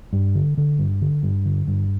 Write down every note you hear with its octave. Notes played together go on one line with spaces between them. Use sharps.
G2
D3
D3
G2
D3
G2
D3
G2